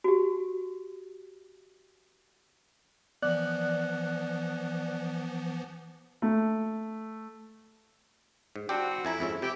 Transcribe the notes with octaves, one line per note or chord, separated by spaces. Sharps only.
F#4 G4
E3 F3 B3 D5 F#6
A3
G#2
E3 C4 D4 F#4 G4
F2 E4 G#5 A#5
F2 G#2 C#4
C3 E4 G4